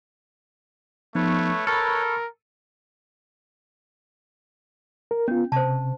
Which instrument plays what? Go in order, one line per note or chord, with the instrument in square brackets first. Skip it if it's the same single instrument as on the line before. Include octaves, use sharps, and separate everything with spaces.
[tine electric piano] F3 B3 D#4 [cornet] A3 [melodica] B4 C#5
[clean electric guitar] A4 [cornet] A#4 [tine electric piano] B5 C#6 F6
[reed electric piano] A#4
[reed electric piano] B3 F4 [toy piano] C#4
[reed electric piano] C3 [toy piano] C5 A5